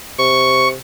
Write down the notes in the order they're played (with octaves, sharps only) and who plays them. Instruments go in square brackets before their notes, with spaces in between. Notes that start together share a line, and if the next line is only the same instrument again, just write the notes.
[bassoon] C3 [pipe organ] C#6